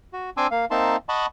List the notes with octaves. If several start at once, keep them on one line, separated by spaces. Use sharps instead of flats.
F#4
C4 D4 G#5 C6 D6 E6
A#3 F5
A#3 C4 D#4 E5 A5 C6
D#5 F#5 A5 B5 C#6